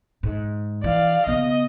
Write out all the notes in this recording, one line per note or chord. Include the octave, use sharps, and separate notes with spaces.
G#2
E3 D5 F5
C#3 B3 D#5